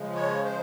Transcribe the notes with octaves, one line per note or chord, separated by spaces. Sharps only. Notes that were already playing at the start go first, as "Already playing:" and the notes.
Already playing: C#3 F3 G#3
C#5
C5